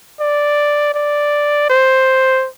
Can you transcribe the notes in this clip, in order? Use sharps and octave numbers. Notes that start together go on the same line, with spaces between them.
D5
D5
C5